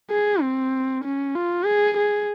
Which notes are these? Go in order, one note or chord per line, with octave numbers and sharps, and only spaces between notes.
G#4
C4
C#4
F4
G#4
G#4